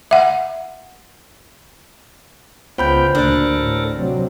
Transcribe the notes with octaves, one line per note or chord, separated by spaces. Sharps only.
E5 F#5
C#2 B3 F4 C5 G5 B5 G6
D2 A#2 D4 A4 A#4
A2
C3 F#3